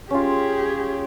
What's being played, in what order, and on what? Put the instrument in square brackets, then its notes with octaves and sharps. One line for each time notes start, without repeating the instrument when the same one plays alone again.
[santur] C#4 F4 [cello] G4 G#4